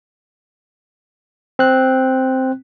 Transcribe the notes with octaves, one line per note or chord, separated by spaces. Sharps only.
C4 F#6